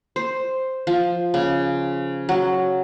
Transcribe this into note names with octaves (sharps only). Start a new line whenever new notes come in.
C5
F3
C#3
F#3